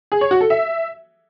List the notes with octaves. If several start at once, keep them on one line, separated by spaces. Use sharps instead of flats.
G#4
C#5
F#4
A4
E5